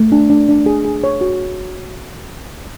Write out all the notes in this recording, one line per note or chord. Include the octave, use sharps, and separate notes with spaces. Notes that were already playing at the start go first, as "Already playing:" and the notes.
Already playing: A3
D4
D4
D4
G#4
G#4
C#5
F#4